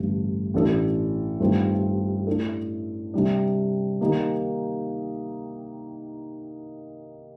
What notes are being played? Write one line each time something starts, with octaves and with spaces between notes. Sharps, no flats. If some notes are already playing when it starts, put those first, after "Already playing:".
Already playing: A1 G2 D3 A3
A1 A2 A3 D4 A4
G2 D#3 A3 C4 F4
A2 A3 D4 A4
C3 G3 D4
D#3 A#3 D#4 G4